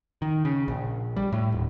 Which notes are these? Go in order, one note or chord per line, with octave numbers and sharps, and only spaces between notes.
D#3
C#3
A#1
G3
A2
D#1